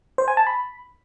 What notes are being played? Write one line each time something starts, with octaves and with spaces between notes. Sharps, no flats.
C5
G#5
A5
B5